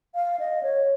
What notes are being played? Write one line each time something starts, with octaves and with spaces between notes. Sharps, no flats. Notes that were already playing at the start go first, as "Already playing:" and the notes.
F5
D#5
C#5